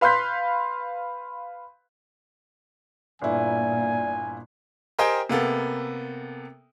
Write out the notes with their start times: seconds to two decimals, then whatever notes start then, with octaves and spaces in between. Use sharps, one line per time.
0.01 B4 F5 C6 F#6 G6 B6
3.22 G1 A#2 E4 D5 G#5
4.99 G4 A#4 C5 D#5 G5 G#5
5.29 C3 A#3 B3 A4